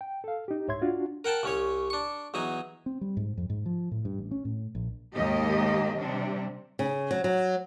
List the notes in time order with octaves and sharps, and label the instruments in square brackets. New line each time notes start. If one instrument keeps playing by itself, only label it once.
[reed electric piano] G5
A4 F5
D#4 G4
C#2 G#2 C#5 E5 C6 G#6
D4 F4 F#4
[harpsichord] A#4 F#5 G5 A5
C2 C#4 C#5
D4 C#6
E2 F#3 D#4 G#5
[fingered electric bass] C4
G3
G#2
F2
G#2
F3
A2
G2
A1
C#4
A2
A#1
[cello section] D#2 G#2 A#3 G4 D#5
C3 G3 D4
[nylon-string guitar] C#3
F#3
F#3